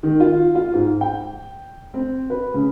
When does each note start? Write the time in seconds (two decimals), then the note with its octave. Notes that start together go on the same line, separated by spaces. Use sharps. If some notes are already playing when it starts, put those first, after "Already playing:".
0.03 D#3
0.20 F4
0.55 F4
0.74 G#2
1.01 G5
1.94 C4
2.30 B4
2.54 C#3